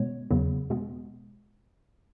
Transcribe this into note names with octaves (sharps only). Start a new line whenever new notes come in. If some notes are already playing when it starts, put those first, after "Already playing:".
Already playing: B2 G#3 B3 C#5
E2 C#3 F#3 B3
B2 G#3 B3